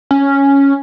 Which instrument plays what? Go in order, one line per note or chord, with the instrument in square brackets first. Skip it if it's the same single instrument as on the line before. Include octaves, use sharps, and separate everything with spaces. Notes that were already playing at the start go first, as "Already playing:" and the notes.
[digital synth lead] C#4